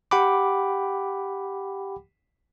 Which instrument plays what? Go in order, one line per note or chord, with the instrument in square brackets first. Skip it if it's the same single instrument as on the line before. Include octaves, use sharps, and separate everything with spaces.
[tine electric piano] G4 F#5 G5 B5 D6